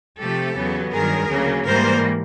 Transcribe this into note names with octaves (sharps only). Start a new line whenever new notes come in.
C3 F3 A3 G4 A4
E2 C#3 F#3 B3
G2 D#3 F#3 G#4 A#4
D2 C#3 F#3 A#3
G#2 E3 G3 A#3 A#4 C5